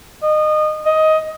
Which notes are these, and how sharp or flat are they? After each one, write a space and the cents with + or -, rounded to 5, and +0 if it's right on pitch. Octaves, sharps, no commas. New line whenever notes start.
D#5 -25
D#5 +15